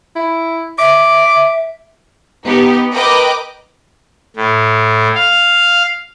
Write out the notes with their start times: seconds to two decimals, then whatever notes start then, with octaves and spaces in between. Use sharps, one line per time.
0.16 E4
0.78 E5 D6
2.44 B3 D#4 G4
2.94 A#4 B4 D#5 G5 D6
4.36 A2
5.15 F5